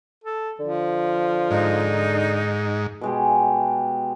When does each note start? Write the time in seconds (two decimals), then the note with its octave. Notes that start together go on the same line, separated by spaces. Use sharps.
0.24 A4
0.60 D3 F3
1.51 G#2 D#4
3.01 B2 G#3 G4